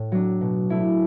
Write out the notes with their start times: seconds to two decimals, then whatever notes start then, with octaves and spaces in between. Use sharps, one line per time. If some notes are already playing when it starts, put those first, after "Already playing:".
Already playing: A2
0.12 F#3 D4
0.41 B2
0.70 A3 E4